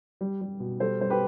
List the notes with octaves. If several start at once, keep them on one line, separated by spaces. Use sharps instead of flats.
G3
G3
B2
G3 A4 C5
G3 C5
G4 B4